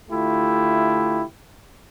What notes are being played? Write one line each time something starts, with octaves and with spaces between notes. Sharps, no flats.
D3 A3 E4 F4 G4